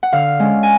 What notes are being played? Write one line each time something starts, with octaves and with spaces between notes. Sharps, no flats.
F#5
D3 F5
G#3 C#4
G#5